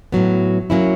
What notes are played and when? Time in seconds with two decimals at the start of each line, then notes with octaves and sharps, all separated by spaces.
0.12 A2 F#3 B3
0.70 F#3 A#3 C#4 E4